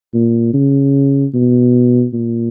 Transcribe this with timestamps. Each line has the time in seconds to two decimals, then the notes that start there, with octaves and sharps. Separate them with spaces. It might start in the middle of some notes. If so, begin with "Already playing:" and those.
0.14 A#2
0.54 C#3
1.34 B2
2.13 A#2